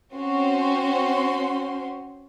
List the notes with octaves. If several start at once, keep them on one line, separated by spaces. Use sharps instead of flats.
C4 C#4 F#4 C5 C6